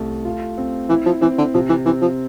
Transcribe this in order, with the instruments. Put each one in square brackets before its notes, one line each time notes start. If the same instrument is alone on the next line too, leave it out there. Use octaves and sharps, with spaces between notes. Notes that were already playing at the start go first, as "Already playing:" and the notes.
Already playing: [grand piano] C2 A3
F4
C4
[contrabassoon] E3 [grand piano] E4
[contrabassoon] F3
[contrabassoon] E3 [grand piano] C4
[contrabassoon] D3
[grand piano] C3 [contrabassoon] F3
[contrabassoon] E3
[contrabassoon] E3 [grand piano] C4
[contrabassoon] F3